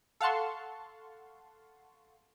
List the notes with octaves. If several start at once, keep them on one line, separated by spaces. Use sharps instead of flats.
A4 F5 F#5 A5 C6 C#6